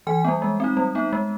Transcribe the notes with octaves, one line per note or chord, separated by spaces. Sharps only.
E3 G#5
G3 B3
G#3
C4 D#4
G3
B3 D#4
G#3